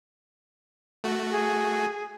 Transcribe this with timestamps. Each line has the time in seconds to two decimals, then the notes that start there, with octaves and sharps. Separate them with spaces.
1.04 A3 F#4
1.31 G#4